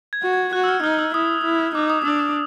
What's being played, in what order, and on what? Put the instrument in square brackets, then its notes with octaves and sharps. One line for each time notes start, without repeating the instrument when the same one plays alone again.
[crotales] G#6
[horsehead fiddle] F#4
[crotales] G#6
[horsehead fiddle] F#4 [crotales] F#6
[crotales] E6
F6
[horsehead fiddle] D#4 [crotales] F6
[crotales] F6
E6
[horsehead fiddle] E4 [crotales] D#6
[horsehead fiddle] E4
[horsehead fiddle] D#4 [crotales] D6
[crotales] D#6
[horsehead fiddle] D4 [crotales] E6
[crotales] D#6